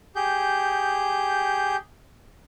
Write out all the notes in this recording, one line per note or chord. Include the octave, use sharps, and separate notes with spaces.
G4 G#4 G6